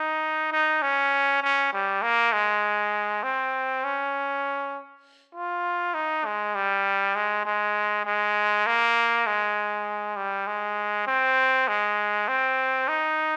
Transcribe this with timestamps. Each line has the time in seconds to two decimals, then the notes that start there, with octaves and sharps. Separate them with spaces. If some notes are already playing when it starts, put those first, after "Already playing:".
Already playing: D#4
0.52 D#4
0.82 C#4
1.42 C#4
1.73 G3
2.02 A#3
2.33 G#3
3.23 C4
3.84 C#4
5.35 F4
5.94 D#4
6.25 G#3
6.55 G3
7.16 G#3
7.45 G#3
8.05 G#3
8.67 A#3
9.27 G#3
10.16 G3
10.47 G#3
11.07 C4
11.68 G#3
12.28 C4
12.88 D#4